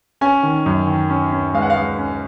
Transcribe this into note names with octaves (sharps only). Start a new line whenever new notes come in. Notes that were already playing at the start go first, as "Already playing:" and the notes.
C#4 G#5
D#3
F#2
D#3
C#4
C#4
G#3 F5
F#5
F5
G#3
C#4